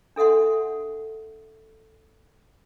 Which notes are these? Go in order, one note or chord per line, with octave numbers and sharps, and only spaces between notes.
D4 A4 E5 F#5 C6